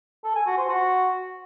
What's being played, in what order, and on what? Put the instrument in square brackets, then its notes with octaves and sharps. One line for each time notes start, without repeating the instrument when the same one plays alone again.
[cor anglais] A4
G#5
F#4
C5
F#4